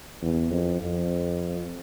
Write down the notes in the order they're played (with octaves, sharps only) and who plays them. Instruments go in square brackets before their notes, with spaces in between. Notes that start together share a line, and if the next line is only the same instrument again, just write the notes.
[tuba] E2
F2
F2